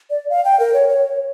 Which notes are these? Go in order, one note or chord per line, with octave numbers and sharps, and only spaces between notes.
D5
F5
G5
A#4
C#5
C#5